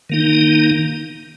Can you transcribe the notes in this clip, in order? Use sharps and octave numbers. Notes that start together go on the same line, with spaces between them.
D#3 A#3 D#4